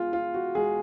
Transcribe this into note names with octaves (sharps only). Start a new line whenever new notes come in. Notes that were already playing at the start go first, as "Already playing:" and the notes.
Already playing: G#3 B3 F4
F4
F#4
G#3 G#4